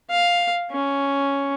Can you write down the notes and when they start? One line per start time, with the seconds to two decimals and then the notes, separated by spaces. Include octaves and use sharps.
0.10 F5
0.71 C#4